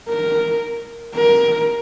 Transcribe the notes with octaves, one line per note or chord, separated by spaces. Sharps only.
A#4
A#4